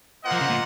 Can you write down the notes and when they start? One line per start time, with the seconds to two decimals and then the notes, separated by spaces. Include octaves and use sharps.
0.24 A#3 F4 C5 D#5 F#5
0.32 F3
0.41 C#3
0.50 A#2